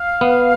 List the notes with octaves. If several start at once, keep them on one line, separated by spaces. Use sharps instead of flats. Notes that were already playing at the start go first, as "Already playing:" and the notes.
Already playing: F5
B3